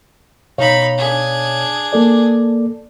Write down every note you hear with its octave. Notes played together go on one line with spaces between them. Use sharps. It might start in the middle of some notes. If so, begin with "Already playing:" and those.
B2 D#4 C#5 F5 B5
D4 G#4
A#3 A4 D5